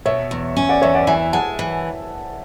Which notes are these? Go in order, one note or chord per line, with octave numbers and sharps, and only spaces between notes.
B2 C#5 E5
E2
C#4
D5 F#5
E2 C#5 E5
D5 F#5
E3 E5 G#5
G#3 F#5 A5
E3